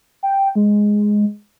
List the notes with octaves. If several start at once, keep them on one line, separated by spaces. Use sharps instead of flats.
G5
G#3